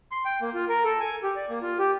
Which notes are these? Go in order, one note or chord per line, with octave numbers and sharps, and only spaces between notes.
C6
G5
A#3
F4
A#4
A4
G#5
G4
D5
A#3
F4
G4